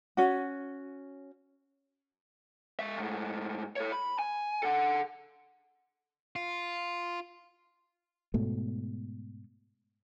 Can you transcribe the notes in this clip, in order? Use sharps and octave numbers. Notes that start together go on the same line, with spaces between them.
C#4 F#4
G#3 E5
G#2 A3
A4 C#5
B5
G#5
A4 F#5
F4
G#2 B2 A3